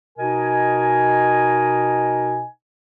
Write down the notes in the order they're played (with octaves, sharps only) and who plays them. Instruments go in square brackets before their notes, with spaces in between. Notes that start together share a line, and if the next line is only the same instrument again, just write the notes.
[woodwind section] B2 D#4 A#4 D#5 G#5